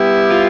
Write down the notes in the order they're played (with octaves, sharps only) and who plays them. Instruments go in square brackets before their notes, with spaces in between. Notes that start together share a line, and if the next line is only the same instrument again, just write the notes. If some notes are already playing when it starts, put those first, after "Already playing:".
Already playing: [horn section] G3 B3 E4 G4
[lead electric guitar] F4